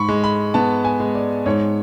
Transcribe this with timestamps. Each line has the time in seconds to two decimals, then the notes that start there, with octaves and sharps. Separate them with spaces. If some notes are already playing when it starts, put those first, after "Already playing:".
Already playing: G#2 B5 C#6
0.09 G#3
0.24 B5
0.54 B3 A5
0.85 G#5
1.00 G#3
1.15 D5
1.46 G#2 C#5